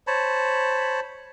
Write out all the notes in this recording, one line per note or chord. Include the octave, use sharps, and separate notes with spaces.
C5 C#5 A5 B5